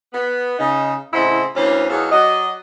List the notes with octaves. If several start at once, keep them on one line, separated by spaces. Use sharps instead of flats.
B3
C#3 D#4
A2 C#3 C4 E4 D#5 F#5
D2 E3 A#3 C#4 C5
E2 F#3 D#4 A4 C#5 F5
F#3 F#4 D5 D#5